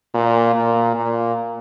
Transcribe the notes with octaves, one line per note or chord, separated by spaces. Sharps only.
A#2
A#2
A#2